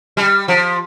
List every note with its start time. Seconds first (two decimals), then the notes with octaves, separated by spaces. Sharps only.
0.17 G3
0.48 F3